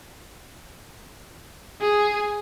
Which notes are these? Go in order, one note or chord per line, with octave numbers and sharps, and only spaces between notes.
G#4